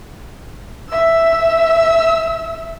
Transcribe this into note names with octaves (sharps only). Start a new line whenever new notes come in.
E5 E6